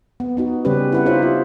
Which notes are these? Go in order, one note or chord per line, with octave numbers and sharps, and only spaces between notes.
B3
B3 D#4 F#4
C#3 G3 C4 C#4 G4 B4
E4 B4 F#5
D#4 F4 G4 C5 C#5 E5
F4